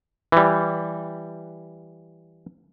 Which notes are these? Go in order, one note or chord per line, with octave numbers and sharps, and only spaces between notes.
E3 G3